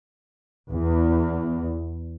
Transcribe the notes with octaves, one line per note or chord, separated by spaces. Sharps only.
E2